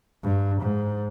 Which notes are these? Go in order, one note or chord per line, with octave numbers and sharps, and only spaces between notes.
G2
G#2